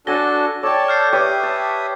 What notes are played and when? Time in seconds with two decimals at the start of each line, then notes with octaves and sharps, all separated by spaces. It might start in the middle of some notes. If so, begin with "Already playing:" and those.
0.07 D4 F#4 A4 G#5 A5 A#6 G7
0.63 A4 C#5 D5 G5 A5
0.88 F6 G6 C7
1.13 G4 B4 C#5 E5 D#6
1.43 A5